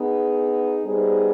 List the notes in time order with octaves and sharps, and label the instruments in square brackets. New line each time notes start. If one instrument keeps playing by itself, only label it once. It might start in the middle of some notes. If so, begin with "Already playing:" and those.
Already playing: [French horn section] B3 D#4 G#4
G3 B3 D#4 G#4 C5